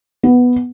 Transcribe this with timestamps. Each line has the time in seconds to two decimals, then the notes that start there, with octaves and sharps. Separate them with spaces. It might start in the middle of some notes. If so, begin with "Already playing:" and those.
0.23 B3